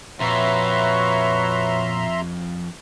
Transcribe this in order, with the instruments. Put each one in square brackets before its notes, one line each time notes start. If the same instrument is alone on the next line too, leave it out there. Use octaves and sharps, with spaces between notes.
[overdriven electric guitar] F2 [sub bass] A#2 [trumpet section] F#4 B4 C#5 [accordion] E5 A#5 C6